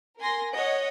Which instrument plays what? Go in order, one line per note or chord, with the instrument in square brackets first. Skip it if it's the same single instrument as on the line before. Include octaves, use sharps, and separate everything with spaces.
[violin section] A#4 G#5 C6 A#6
C#5 D#5 F#5